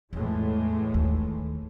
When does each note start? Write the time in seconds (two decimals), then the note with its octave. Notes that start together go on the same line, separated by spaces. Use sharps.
0.13 E2 A2 E3 G#3
0.94 D#2